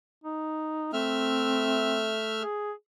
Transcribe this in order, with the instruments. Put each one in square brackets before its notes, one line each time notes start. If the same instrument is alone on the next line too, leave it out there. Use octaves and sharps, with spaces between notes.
[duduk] D#4
[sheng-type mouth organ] A3 E5 F6 [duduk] C4
[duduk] G#4